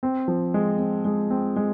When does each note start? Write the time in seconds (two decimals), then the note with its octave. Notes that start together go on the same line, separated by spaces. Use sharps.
0.03 C4
0.28 F3
0.54 G#3
0.79 C4
1.05 G#3
1.30 C4
1.56 G#3